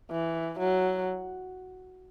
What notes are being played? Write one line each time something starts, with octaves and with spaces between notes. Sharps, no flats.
E3
F#3